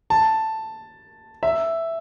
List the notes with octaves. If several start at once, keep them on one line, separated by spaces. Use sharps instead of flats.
A5
E5